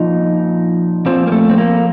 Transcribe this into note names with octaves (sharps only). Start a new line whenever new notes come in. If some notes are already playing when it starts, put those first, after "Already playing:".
Already playing: A#2 F3 D#4
A#2 F3 C4
A#3
A3
C4
A#3